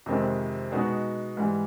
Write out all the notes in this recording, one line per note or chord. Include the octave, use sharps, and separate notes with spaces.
F2 C3 D#3 G#3 C4
B2 G#3 B3 D#4 F#4
G#2 E3 G3